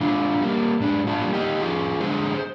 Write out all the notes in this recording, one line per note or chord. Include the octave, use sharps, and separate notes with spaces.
G#2 D4 F4
G3 A#3
G#2 D4
D4 F4
G3 A#3
D#4 G4
F2 F4 G#4
D3 G#3 G#4 C5